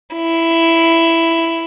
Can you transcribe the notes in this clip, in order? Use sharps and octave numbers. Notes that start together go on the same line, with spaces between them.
E4